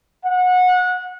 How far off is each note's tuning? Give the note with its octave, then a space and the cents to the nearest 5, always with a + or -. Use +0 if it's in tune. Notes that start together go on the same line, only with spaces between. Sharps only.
F#5 -25